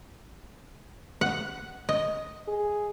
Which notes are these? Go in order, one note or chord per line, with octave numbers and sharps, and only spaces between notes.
F#5
D#5
G#4